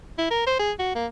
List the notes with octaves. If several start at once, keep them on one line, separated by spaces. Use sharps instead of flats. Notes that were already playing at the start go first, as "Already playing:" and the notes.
E4
A#4
C5
G#4
F#4
A#3